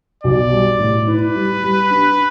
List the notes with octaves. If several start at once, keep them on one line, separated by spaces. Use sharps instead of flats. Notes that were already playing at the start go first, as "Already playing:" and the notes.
B1 D5
G3
A2
E4 B4
G3
G3
D4